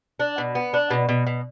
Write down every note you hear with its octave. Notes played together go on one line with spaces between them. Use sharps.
D4
B2
B3
D4
B2
B2
B2